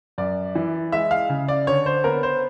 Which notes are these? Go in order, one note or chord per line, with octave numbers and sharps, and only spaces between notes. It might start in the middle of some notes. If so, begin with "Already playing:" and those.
F#2 D5
E3
G#3 E5
F5
C#3
D5
D3 C#5
C5
B3 A#4
C5